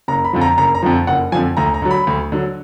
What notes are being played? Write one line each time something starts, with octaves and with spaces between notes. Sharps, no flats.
F#1 A#5
B5
F2 D3 F3
A#5
F#1 A#5
A#5
F2 D3 F3
F#1 F#5
F2 D3 F3 G#5
D2 A#5
A#5
D3 F#3
B5
D2
D3 F#3